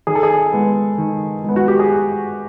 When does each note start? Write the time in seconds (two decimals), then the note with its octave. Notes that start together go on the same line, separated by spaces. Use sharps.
0.07 D#3 G#4
0.15 A4
0.23 G#4
0.52 G#3 B3
0.98 D#3
1.44 G#3 B3
1.56 F#4
1.68 G4
1.79 G#4